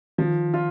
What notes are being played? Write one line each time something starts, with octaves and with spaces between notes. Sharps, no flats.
D#3 F3
F4